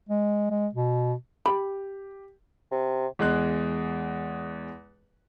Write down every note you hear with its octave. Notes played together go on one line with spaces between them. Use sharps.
G#3
G#3
B2
G4 B5
C3
E2 G#3 F#6